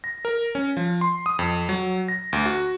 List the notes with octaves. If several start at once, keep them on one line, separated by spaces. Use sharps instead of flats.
A#6
A#4
C#4
F3
C6
D#6
F2
F#3
A#6
D2
F#4